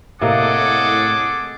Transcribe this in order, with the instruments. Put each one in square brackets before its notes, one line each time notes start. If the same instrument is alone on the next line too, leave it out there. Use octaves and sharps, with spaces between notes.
[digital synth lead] A2 [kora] C3 A#3 [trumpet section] G#4 A4 D6 [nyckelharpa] D#5 F#5